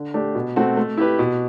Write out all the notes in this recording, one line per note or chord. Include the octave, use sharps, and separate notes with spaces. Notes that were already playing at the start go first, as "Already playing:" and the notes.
Already playing: D3
A3 D4 G4
B2
A3 C4 F#4
A3
E4 G4 B4
B2